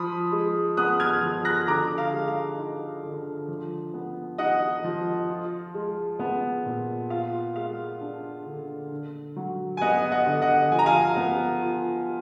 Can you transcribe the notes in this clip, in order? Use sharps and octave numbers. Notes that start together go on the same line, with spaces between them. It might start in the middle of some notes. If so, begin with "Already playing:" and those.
Already playing: F3 B5 D#6
G#3
B3 D#6 F#6
F6 G#6
F3
F#6 A#6
D3 A#5 D6
F5
G#3
F5
D#4
D3
F3
B3
D#4 D#5 F#5
F3
F4
G#3
B3
A#2
F4 F5
G#3 F5
D4
D3
D3
F#3
G#5
B3 D#5 F#5
D#5 F#5
D3
D#5 F#5
F3 G#5
A#5
F5 G#5
B3
F4